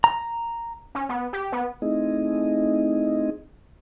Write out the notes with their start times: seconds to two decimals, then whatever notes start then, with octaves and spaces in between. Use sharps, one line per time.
0.04 A#5
0.95 C#4
1.09 B3
1.33 G4
1.53 B3
1.82 A3 C4 D#4 E4 G#4 D#5